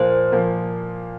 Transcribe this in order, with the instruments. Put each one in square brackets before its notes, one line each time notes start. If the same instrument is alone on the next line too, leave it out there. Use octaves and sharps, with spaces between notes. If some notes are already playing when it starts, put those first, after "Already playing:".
Already playing: [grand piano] A#2 F3 A#3 [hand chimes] C5
[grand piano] A#2 F3 A#3